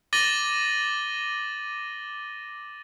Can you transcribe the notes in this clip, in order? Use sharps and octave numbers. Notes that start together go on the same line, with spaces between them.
D6 A6 A#6 D#7 F#7 G7